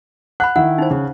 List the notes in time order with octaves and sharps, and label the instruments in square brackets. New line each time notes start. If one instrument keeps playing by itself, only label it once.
[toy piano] F#5 B5 [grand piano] F#6
[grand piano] D#3 E4 [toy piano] F#5
[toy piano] D#4 C5
[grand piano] C#3